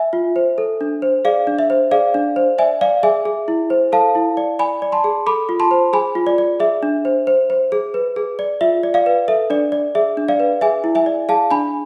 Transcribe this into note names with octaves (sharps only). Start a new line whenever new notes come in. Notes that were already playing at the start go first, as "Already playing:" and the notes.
Already playing: E5 G#5
F4
C5
A4
D4
C5
G#4 D5 F5
D4
E5
C5
G#4 D5 F5
D4
C5
D5 E5 G#5
D5 F5
G#4 E5 G#5
G#4
E4
C5
A4 F5 A5
E4
D5
D5 G#5 B5
D5
A5 C6
G#4
A4 B5 D6
F4
A5 C6
C5
G#4 G#5 B5
F4
D5
D5
G#4 E5
D4
C5
C5
C5
G#4
B4
G#4
D5
F4 E5
D5
D5 F5
B4
A4 E5
D4 D5
D5
G#4 E5
D4
D5 F5
B4
G#4 E5 G#5
E4
E5 G#5
D5
G#4 F5 A5
D4 G#5 B5